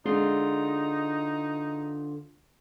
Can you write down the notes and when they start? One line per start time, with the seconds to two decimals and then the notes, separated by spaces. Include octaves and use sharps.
0.05 D3 G#3 D#4 F4 C6